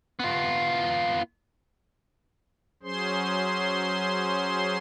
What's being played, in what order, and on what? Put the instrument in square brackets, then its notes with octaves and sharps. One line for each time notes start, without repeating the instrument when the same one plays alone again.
[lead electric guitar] B3 F4
[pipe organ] F#3 C#4 G#4 C5 C6